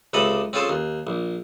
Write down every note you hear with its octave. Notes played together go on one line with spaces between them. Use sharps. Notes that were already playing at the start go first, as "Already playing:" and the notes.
C#2 C3 A4 D#5 B5
C4 C#4 F4 G#4 A4 C5
D#2
A#1